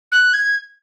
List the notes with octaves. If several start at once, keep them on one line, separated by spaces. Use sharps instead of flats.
F#6
G#6